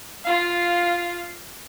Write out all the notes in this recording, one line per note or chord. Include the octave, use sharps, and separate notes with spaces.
F4 F5